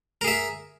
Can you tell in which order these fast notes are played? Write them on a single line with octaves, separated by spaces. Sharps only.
A#4 G#4 E5